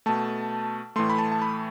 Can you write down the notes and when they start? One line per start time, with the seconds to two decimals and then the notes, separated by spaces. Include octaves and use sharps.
0.06 B2 A3 A5
0.96 A2 E3 A3 C6
1.10 B5
1.18 A5
1.32 A5
1.42 B5